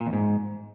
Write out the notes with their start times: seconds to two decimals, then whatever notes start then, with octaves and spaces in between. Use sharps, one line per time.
0.01 A#2
0.07 E2
0.13 G#2